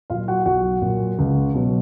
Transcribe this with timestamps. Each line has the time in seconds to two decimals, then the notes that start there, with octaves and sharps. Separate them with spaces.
0.10 A#2 F#3 F4 F5
0.28 F#4 F#5
0.46 B1 F#4 F#5
0.82 A#2 F#3
1.19 C#2
1.54 B2 F#3